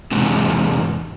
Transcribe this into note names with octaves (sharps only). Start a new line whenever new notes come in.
E2 G#2 C3